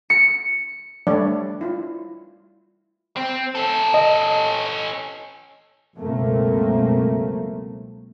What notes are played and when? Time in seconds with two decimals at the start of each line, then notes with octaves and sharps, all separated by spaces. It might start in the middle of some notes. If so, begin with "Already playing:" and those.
0.10 C#7
1.07 G3 A3 D4 C#5 D5
1.61 E4 F4
3.16 C4
3.55 C#4 A4
3.94 D#5
5.98 C#2 F#2 B2 A3 A#3 C4